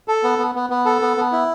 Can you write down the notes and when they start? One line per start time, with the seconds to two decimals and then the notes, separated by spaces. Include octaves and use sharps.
0.08 A4
0.23 B3
0.39 B3
0.55 B3
0.70 B3
0.85 A4
1.02 B3
1.17 B3
1.32 E4